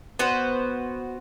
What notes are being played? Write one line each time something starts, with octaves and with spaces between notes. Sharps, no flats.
B3 F#4 C5